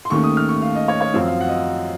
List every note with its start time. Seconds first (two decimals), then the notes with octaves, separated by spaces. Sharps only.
0.05 C6
0.10 D#2 D#3 A3 C#4 C#6
0.23 D#6
0.37 F6
0.49 C#6
0.62 F5
0.75 D#5
0.88 C#5
1.01 C#5
1.14 F#2 F3 C4 F5
1.28 F5
1.41 F#5
1.48 D#5